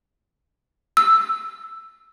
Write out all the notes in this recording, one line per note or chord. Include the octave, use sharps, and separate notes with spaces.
E6